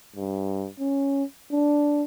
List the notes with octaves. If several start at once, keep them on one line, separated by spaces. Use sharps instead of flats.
G2
C#4
D4